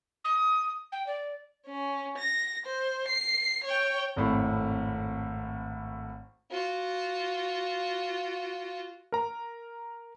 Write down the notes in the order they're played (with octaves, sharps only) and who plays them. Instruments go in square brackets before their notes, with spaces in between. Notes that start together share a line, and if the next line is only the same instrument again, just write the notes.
[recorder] D#6
G5
D5
[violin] C#4
A#6
C5
C7
C#5 G5
[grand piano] G#1 F2 A2 B5
[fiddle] F4 F#4
[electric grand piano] A#4 A#5